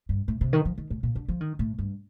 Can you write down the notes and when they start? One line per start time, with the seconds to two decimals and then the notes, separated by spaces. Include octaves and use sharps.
0.09 G2
0.28 A2
0.41 C3
0.53 D#3
0.65 F3
0.78 D#3
0.90 A2
1.03 A#2
1.16 D3
1.28 F3
1.41 D#3
1.59 A2
1.79 G2